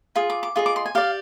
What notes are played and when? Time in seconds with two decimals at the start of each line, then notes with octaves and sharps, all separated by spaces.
0.16 F4 G#4
0.30 D6
0.43 D6
0.56 F4 G#4 D#5
0.66 D6
0.76 C6
0.86 G#5
0.95 G4 D5 F5